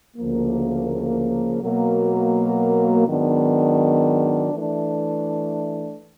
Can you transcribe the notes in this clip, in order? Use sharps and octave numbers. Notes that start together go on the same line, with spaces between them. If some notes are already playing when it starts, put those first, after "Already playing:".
D2 C#3 F3 A#3
B2 F#3 A#3
G#2 D#3 F#3 B3 D4
E3 A3 D4